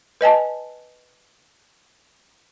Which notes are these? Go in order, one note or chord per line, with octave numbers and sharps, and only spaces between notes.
B4 D#5 G#5 A5